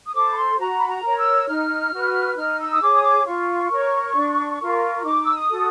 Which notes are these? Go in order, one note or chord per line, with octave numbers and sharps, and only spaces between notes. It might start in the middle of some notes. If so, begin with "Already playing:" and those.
D#6
A4 C5 D6
B5
C6
F#4 A#5
B5
A#5
A#4 C#5
E6
D#4 F6
F#4 B4
D#4 F6
E6
D#6
G#4 C#5 D6
D#6
D6
F4 C#6
A#4 C#5
D4
F4 A#4
D#4 D6
E6
D#6
F#4 A4